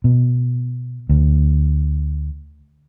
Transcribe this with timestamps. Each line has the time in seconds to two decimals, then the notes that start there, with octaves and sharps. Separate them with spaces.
0.04 B2
1.09 D2